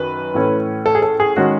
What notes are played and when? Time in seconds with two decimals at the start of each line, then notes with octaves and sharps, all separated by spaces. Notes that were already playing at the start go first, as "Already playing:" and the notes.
Already playing: F#2 D#3 B4
0.34 A2 E3 A3 C#4
0.86 A4
0.95 G#4
1.02 A4
1.20 G#4
1.36 D#3 G#3 C#4 F#4